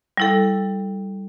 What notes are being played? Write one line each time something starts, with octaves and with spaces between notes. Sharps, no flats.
G3 E4 A4